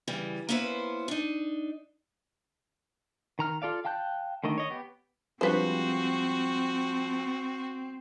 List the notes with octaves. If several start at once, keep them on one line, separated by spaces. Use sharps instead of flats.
C#3 E3 G3
A#3 B3 C#4 E4 B4 C5
D4 D#4
D#3 A#5 F6
F4 A4 D5 F5
F5 G5 A5 F#6 G6
D3 D#3 A3 D#5
C#5 D#5
B3 G4
F3 G3 G#3 C4 D4 F#4 B4 C5